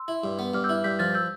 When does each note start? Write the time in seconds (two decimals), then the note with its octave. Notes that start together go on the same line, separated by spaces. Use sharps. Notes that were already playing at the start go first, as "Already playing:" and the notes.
Already playing: C6 E6
0.08 E4
0.24 G2
0.39 B3
0.54 G2 D6 F6
0.64 E6 G6
0.69 E4
0.84 G2 G6 B6
0.99 F3 F6 A6
1.14 E6 G6